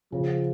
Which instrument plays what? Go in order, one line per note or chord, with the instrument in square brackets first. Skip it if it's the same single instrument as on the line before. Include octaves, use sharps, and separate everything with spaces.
[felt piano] C#3 [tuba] F3